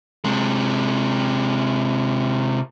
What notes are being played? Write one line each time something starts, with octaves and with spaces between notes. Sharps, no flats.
C3 G#3